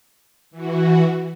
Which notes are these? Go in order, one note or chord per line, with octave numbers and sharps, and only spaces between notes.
E3 F#4